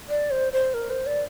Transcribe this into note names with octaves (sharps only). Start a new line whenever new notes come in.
D5
C5
C5
A#4
C5
D5